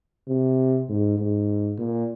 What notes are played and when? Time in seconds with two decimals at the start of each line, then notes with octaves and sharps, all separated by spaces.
0.28 C3
0.89 G#2
1.19 G#2
1.79 A#2